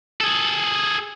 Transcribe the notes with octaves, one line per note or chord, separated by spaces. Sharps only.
G#4 A4